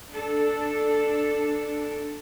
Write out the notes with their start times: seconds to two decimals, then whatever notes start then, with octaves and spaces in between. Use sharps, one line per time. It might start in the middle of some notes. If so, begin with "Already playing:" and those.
0.11 D4 A4